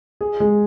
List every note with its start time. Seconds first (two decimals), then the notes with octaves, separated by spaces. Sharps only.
0.21 G#4
0.40 G#3